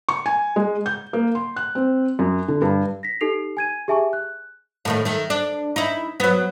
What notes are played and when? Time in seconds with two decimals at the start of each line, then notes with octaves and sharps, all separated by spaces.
0.09 C#6
0.26 G#5
0.56 G#3
0.86 G6
1.13 A#3
1.35 C6
1.56 F#6
1.75 C4
2.19 F#2
2.48 D3
2.62 G2
3.03 A#6 B6
3.21 D#4 G4 A4 C7 F7
3.57 G#5 G#6 D#7
3.88 G4 G#4 E5 G#5 A5 C#6
4.13 F#6
4.85 A2 D#3 A3
5.05 D#3 A3
5.30 D4
5.76 D#4 E4
6.20 F#3 B3